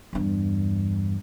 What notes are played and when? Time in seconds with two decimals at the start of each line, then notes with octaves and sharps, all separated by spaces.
0.13 E2 G2